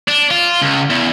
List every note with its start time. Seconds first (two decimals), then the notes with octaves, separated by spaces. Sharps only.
0.08 D4
0.31 F4
0.62 C#2
0.90 E2